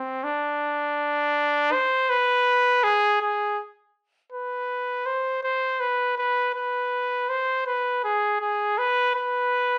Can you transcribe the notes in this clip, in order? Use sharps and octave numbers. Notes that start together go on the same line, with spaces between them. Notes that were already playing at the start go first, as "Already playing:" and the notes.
Already playing: C4
D4
C5
B4
G#4
G#4
B4
C5
C5
B4
B4
B4
C5
B4
G#4
G#4
B4
B4